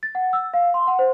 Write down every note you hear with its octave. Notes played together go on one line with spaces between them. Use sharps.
A6
F#5
E6
F5
C6
F#5
C5